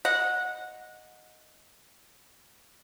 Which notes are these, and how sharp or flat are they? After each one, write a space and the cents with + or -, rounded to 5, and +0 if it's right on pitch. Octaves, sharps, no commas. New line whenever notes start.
D#5 +0 F#5 -15